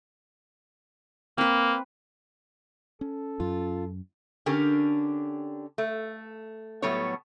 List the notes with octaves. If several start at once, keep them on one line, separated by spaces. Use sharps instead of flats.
A#3 C4 B4
C#4 A4
F#2 F4
D3 C#4 D4 G4 A#4
A3
A2 F#3 G3 B3 A4 C#5